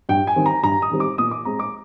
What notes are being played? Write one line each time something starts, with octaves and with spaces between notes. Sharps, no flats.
G2 G5
G#5
D#3 G3 C4
A#5
G2 A#5
D#6
D#3 G3 C4
D6
A#2 D#6
D6
G#3 C4 A#5
D6